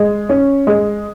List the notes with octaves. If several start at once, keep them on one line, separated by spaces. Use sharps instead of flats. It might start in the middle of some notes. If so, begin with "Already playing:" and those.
Already playing: G#3
C#4
G#3